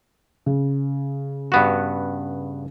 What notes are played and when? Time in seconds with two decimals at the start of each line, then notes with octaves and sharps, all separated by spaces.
0.46 C#3
1.52 G2 B3 F#4